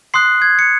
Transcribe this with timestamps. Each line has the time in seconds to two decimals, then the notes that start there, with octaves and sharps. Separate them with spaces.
0.14 C6 D#6 F#6 C7
0.42 G#6
0.59 C#7